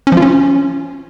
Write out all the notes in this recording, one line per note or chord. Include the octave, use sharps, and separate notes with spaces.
C#4
F3
F4
C#4